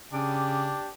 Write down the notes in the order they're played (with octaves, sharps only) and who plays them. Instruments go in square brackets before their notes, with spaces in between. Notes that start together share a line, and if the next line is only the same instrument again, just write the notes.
[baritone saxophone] C#3 [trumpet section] D4 G4